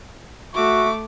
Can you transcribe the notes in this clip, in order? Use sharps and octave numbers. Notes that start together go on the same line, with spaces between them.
A3 F#4 E5 C#6 D6